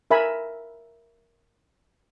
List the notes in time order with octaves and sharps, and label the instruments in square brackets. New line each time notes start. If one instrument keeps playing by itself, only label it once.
[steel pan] A#4 E5 G#5 B5